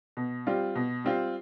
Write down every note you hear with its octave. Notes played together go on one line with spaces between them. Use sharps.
B2
G3 C4 F4
B2
G3 C4 F4